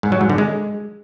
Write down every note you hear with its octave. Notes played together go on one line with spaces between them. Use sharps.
G#2
F#3
G#2
D3
G#3